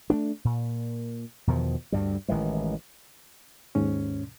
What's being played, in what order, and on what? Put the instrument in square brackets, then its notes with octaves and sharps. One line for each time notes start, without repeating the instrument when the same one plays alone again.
[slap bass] A3 B3 D4
A#2
E2 B2 D#3 F3
D2 G2 G3
A1 D#3 E3 G#3
[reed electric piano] D#2 G#2 C#4